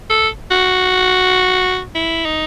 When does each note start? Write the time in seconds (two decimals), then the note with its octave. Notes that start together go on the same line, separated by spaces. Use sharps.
0.10 A4
0.51 F#4
1.95 E4
2.26 D#4